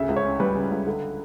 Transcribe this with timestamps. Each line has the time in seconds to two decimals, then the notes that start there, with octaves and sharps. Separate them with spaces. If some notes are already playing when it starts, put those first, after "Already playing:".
Already playing: D2 C#3 E5
0.09 C#2
0.16 C#5
0.25 C#4
0.40 G3 B4
0.55 C#3
0.70 C#2
0.87 D3